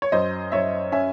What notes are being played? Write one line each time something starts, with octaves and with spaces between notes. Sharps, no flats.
C#5
F#2 C5 D#5
F#2 C#5 E5
C#4 E5 G#5